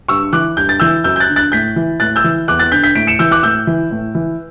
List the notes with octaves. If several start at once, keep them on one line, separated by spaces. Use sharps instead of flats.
G2 C#6 E6
E3 D6 F#6
G2 G6
A6
E3 E6 G6
F#2 E6 G6
G6
F#6 A6
D3
F#6 A6
A2 G6 B6
E3
A2 F#6 A6
E6 G6
E3
E2 D6 F#6
F#6 A6
D3 G6 B6
G6 B6
A2 B6 D7
C#7 E7
E3 E6 G6
D6 F#6
A2 E6 G6
E3
A2
E3